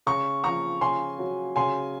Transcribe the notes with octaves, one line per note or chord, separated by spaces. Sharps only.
C#3 A#5 C#6
F3 A#5 C#6
C#3 G#5 C6
F#3
C#3 G#5 C6